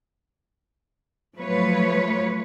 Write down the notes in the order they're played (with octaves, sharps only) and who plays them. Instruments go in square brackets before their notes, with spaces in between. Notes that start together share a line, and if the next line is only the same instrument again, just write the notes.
[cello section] F3 F#3 A3 B4 C#5